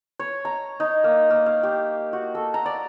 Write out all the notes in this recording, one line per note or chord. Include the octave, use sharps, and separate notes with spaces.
C#5
A#5
D#4
A#3
A#3
F5
G4
F#4
A4
A#5
D5